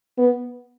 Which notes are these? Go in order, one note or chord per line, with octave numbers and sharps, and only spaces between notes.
B3